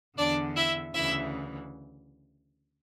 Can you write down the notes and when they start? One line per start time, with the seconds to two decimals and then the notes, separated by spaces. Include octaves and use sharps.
0.18 E2 D3 D4 D5
0.56 E4 E5
0.94 D2 C#3 E3 E4 E5